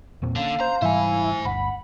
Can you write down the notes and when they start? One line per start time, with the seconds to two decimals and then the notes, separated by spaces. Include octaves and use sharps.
0.22 E2 A#2 C4
0.36 D3 A#3 C#4 F5
0.60 C5 A#5
0.82 G#2 E3 G3 E4 C5 G#5
1.45 G1 D2 F#5 B5